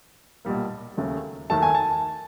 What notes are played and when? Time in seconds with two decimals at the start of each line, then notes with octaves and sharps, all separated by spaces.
0.45 B1 A#2 G3 A#3
0.97 D#2 C#3 F#3 A3
1.50 D#2 D#3 F#3 A3 A5
1.62 G#5
1.75 A5